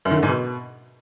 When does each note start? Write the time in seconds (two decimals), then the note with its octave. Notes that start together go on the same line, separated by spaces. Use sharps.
0.05 F#2
0.11 D#3
0.17 D3
0.23 G#2
0.29 B2